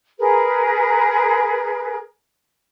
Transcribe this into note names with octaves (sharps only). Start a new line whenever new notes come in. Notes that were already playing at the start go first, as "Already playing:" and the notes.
G#4 A#4 B4